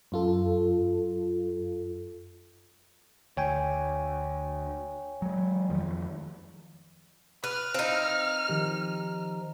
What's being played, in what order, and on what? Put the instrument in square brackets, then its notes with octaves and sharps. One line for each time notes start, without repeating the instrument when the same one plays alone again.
[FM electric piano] F#2 F4 A4
[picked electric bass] D2 [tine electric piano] C#5 G5 G#5
[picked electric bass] F#3 G#3
F2 D#3 F3
[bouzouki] B4 [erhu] F6
[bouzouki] C4 D#4 [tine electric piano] F5
[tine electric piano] D#3 F3 G4